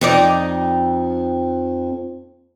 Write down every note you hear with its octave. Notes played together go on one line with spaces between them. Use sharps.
F2 D#4 D5